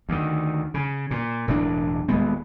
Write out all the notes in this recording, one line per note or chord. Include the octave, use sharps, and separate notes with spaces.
D2 D#3
C#3
A#2
E1 A2 F#3 D4
D#1 G#3 B3